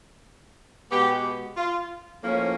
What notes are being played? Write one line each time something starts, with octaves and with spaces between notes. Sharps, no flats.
B2 G#3 B3 G4
F4
A2 F3 A#3 C#4